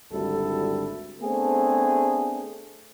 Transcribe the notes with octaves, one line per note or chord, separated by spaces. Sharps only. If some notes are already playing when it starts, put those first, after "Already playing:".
G#1 D2 G3 E4 A4
A3 B3 C4 D4 G#4